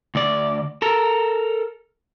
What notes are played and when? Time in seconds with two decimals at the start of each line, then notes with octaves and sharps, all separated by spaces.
0.15 D2 D5
0.82 A4 A#4